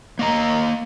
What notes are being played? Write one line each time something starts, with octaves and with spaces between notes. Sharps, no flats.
A#3 D#5 A#5